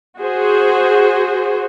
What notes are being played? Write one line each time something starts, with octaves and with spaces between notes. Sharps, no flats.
F#4 G#4 C5